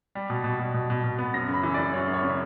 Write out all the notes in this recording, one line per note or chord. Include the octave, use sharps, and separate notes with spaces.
G3
B2
B2
B2
B2
B2
B2
B3
F#2 A#6
C#3
B5
E3
D5
E3
F#2 C#5
F#2
C#5
C#3